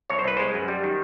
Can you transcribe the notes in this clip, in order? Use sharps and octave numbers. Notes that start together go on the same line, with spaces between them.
C2 C#5
C5
C2 B4
G#3 C5
F#2
G3
D#3